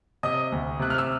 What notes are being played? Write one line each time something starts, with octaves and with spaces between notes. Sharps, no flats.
C3 D#5 D#6
D2
C3 F#6
F6
E6